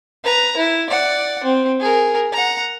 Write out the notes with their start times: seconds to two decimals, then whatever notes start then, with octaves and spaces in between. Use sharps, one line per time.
0.24 B4 A#5
0.57 E4
0.90 D5 F#5
1.44 C4
1.80 G#4 A#4
2.32 F#5 A#5